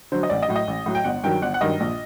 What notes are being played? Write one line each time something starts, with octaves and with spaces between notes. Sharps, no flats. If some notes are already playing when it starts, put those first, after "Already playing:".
D3 F#3 C5
D#5
A1 D5
D#5
A2 F#3
D#5
A1
A2 F#3
G5
G1 F#5
G2 D#3 F#3 G5
G1 F#5
F#5
G2 D#3 F#3 D#5
A#1